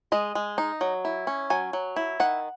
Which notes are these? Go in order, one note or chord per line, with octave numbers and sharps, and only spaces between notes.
G#3 D#5
G#3
D#4
F#3
E4
C#4
F#3 G#5
F#3
E4
D#3 F#5